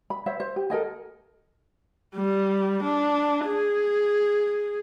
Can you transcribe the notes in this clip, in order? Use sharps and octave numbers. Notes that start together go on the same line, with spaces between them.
B5
C5 C#5 E5
C5
G4
A4 A#4 D#5 G#5
G3
D4
G#4